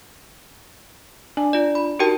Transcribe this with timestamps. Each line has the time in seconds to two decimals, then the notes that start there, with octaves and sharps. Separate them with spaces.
1.37 D4 G#5
1.53 F4 D5
1.75 B5
1.99 D#4 F#4 G4 A#4 G5 A5